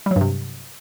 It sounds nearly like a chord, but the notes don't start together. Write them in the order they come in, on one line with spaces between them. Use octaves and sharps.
G3 F#3 G2 C3